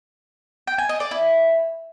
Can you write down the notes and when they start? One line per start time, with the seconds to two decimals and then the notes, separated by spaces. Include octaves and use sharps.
0.67 G5
0.78 G#5
0.89 D#5
1.00 D5
1.11 E4